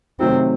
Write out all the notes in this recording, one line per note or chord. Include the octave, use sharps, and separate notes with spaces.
C3 D#3 F#3 A3 C4